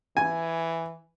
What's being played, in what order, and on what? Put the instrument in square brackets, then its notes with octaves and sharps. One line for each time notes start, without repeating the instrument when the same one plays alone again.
[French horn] E3 [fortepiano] G#5